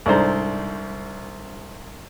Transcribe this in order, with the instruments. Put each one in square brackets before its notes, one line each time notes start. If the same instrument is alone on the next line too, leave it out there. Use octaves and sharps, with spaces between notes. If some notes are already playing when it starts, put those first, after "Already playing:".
[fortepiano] C2 G#2 D4 A4 C5 A#5